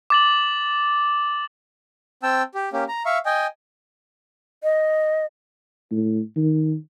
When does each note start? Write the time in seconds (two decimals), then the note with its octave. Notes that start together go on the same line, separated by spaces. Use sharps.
0.10 D6 A6 F#7
2.23 C4 G5 A5 E6
2.55 G4
2.73 A#3 C#4 G4
2.89 A#5
3.06 E5 F5 C#6
3.26 D#5 G5 G#5
4.63 D#5
5.91 A2
6.36 D#3